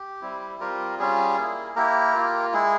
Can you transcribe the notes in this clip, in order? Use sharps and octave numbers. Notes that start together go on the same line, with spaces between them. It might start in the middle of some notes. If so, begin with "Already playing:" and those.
Already playing: G4
G3 C4 E4
G3 C4 F4 G4 A#4
G3 C#4 F4 G#4
A#3 E4
A#3 E4 G4 A#4
A#3 F4
G#3 E4 G#4